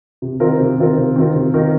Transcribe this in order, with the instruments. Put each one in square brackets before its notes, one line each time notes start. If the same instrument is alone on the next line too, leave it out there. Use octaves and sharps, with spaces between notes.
[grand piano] C3
D#3 C4 F4 A#4
C3
D#3 C4 F4 A#4
C3
D#3 C4 F4 A#4
C3
D#3 C4 F4 A#4